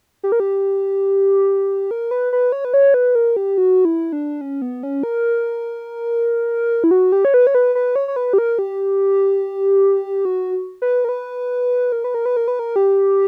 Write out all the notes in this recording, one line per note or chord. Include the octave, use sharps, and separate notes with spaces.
G4
A#4
G4
A#4
B4
B4
C#5
B4
C#5
B4
A#4
G4
F#4
E4
D4
C#4
B3
C#4
A#4
E4
F#4
G4
C#5
B4
C#5
B4
B4
C#5
C#5
B4
G4
A#4
G4
F#4
B4
A#4
B4
A#4
B4
A#4
B4
A#4
B4
A#4
G4